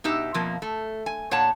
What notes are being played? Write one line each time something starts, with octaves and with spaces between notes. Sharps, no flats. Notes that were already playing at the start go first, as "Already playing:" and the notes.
B2 D#4 G4 E5
F2 B2 F3 A#3
A3
G#5
A#2 C#5 F#5 A5